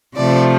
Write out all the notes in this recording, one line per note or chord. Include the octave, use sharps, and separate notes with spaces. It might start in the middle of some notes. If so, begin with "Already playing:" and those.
C3 F3 A3 D5